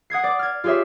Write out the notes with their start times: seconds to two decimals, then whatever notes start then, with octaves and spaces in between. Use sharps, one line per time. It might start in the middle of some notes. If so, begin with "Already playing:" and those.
0.10 F#5 D#6 G#6 C7
0.24 D5 D6
0.39 F6 G#6
0.64 F4 G4 G#4 C#5 E5